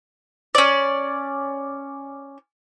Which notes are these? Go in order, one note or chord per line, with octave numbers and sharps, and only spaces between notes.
C#4 D5